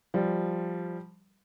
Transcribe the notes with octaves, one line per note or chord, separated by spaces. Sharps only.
F3 G3